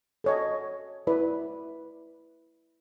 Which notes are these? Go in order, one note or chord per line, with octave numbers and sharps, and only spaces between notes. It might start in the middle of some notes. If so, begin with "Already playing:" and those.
A4 C#5 D#5
E4 B4 D5